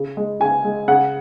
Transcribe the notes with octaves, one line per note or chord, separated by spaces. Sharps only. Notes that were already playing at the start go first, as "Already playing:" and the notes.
Already playing: C#3
G#3
C#3 G#5
G#3
C#3 F#5